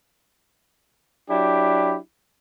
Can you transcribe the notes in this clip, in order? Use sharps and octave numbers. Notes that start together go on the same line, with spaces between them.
F#3 D4 E4 G4